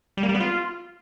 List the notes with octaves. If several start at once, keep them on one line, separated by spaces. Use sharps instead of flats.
G3
A#3
G3
B3
F4